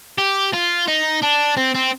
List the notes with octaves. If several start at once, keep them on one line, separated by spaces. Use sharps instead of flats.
G4
F4
D#4
D4
C4
C4